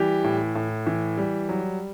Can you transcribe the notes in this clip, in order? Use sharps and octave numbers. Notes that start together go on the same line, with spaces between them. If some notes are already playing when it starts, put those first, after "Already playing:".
Already playing: E3 G3 G4
A2
A2
E3
G3
F#3